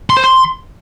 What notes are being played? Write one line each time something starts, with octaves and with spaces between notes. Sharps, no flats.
C6
C5
C6